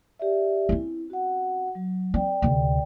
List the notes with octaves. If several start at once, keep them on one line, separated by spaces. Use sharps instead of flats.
G4 D5 E5
C4 C#4 E4
F#4 F#5
F#3
C4 D5 G5
D2 C3